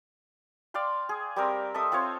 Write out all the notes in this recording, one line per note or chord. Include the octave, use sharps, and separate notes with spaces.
D5 F5 G5 C6
G#4
G3 C4 A#4
A4 D#5 E5 D#6
C4 F4 C5 C#5